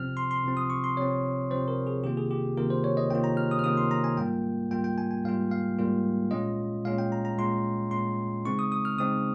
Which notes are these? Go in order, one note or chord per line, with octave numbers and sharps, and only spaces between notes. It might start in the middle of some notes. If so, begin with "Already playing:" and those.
Already playing: C3 F3 C4 F6
C6
C6
C3 F3 C4
D#6
C#6
C6
C3 F3 C4 C#5
C3 F3 C4 C5
A#4
G#4
C3 D#3 A#3 F4 G4
G#4
G4
C3 D#3 A#3 F4 A#4
C5
C#5
D#5
C3 D#3 A#3 F4 G5
A#5
F6
D#6
F6
C3 D#3 A#3 F4 D#6
C6
A#5
G#5
G#2 G3 A#3 F4 G5
G#2 G3 A#3 F4 G5
G5
G#5
G#5
G#2 G3 A#3 F4 F5
F5
G#2 G3 A#3 F4
A#2 G#3 C#4 F4 D#5
A#2 G#3 C#4 F4 F5
G5
A#5
A#5
A#2 G#3 C#4 F4 C6
A#2 G#3 C#4 F4 C6
C#3 G#3 C4 D#4 C#6
D#6
D#6
F6
C#3 G#3 C4 D#4 D#6